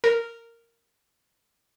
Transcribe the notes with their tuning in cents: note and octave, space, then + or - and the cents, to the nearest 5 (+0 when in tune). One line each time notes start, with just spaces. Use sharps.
A#4 -10